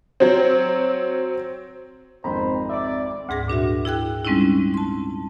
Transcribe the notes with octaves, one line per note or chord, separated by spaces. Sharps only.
F#3 C4
G#1 F2 C5 A#5 B5
D5 E5 D6
D2 G#2 G#4 A#6
A#2 D4 F#4 E5
E4 G#4 G5 F#6
G3 G#3 C4 C#4 D#4 E4
A5 C6